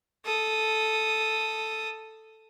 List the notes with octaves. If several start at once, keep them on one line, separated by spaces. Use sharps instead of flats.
A4 D#6